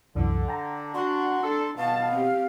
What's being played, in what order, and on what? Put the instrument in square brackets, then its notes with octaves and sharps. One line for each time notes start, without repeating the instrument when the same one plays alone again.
[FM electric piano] C2 F#2 E3 [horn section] D3
[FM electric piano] G5 A5 A#5
[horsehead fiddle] D4 [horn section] F#4 [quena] C6
[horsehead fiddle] D4 [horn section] A4
[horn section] B2 [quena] F5 [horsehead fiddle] A5
[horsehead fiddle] C4 G4